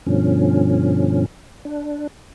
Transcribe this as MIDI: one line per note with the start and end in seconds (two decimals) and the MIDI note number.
0.06 1.26 43
0.06 1.26 47
0.06 1.26 50
0.06 1.26 53
0.06 1.26 61
1.65 2.07 62